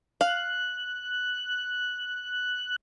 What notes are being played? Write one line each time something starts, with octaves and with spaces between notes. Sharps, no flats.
F5 F#6